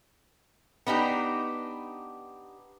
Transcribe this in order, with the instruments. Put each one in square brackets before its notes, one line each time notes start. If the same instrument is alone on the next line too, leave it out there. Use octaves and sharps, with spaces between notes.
[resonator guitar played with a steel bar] B3 D4 D#4 G4